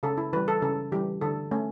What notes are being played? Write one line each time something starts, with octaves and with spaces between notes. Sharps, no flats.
C#3 A4
E4
E3 G3 B4
A4
C#3 A4
E3 G3 G4
D3 A4
A3 C#4